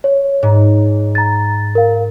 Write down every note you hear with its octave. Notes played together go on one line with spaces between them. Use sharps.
C#5
G#2
A#5 A6
A#4 F5